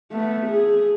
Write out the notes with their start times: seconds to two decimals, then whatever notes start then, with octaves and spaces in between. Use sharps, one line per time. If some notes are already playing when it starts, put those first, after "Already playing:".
0.12 A3 B3
0.47 G#4